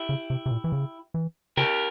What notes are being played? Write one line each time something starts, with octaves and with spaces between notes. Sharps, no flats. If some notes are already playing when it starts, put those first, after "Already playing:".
Already playing: E4 G4
C#3
C3
C3
A#2
E3
C#3
E3
C#3 G4 A#4